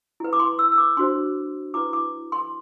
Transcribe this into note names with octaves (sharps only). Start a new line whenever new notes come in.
E4 B4
D6
C6
E6
E6
D6
D4 F#4 C5 C6
E4 B4 D6
D6
C6